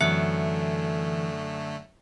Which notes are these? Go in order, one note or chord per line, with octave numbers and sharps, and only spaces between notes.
F#2 D3 E3 A3 E5 F#6 C#7